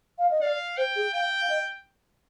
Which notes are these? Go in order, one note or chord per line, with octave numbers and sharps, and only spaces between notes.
F5
D#5
D5 F5
C5 G5
G#4
F5 G5
F5
D#5